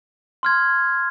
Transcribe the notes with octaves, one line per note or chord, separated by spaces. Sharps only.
C6 F6 G#6